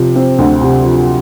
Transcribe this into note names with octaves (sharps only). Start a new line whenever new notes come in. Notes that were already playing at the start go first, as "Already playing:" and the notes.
Already playing: C3 F3
C4
D2
C3
F3